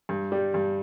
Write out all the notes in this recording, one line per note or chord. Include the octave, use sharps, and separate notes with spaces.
G2
G3
G2